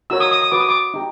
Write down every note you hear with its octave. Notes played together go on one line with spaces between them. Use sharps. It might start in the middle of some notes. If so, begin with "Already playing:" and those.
D#4 F#4 A#4 C#5 E6
D#6
D#6
D#6
F#4 B4 D6
D#6
D6
D#4 G4